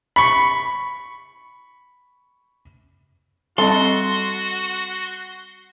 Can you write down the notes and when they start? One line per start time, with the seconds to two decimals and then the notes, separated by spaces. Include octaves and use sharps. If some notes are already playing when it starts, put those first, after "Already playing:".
0.16 B5 C#6
3.58 G3 C4 F#4 A4 D#5 C6